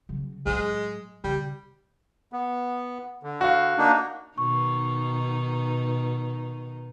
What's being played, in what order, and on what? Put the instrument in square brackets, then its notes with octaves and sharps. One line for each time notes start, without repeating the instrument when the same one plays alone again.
[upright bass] C#3 F#3
[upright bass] A2 F#3 [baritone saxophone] G#3
[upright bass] C#3 [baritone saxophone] G3
[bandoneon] B3
D3
[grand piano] F#4 F5
[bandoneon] A#3 D4 D#4
[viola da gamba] B2 D#3 D#4 [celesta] C#6